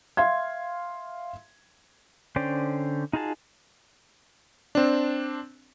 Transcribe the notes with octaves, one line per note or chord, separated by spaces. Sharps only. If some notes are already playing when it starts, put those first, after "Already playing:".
E5 F5 C6 G#6
D3 C#4 C5 D5 G5
D#4 F4 F#4 G#4 A5
C4 D4